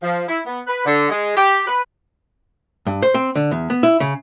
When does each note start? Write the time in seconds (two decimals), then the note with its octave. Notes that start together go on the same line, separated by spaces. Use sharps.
0.02 F3
0.28 E4
0.46 B3
0.67 B4
0.86 D3
1.10 G#3
1.36 G4
1.67 B4
2.87 G2
3.02 C5
3.14 C4
3.35 D3
3.51 E2
3.70 B3
3.83 E4
4.00 C#3